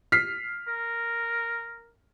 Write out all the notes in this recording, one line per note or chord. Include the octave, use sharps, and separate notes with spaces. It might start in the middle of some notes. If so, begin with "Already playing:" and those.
F6 B6 C7
A#4